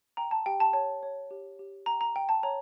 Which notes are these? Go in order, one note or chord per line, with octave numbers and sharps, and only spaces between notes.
G5 A#5
A5
G4 G5
A5
C#5 A5
C#5
G4
G4
G5 A#5
A#5
G5
A5
C#5 A#5